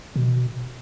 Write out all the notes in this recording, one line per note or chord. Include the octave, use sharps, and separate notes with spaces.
B2